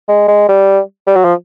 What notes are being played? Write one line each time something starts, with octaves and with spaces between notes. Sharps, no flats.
G#3
G#3
G3
G3
F#3
F3